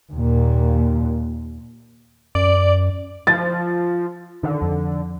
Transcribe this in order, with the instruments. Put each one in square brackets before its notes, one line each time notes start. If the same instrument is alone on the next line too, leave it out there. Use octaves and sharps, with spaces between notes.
[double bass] D#2 A#2
[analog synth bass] F#2 [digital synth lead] D5
[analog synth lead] F3 [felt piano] A6
[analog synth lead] D3 [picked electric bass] D#3
[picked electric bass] F2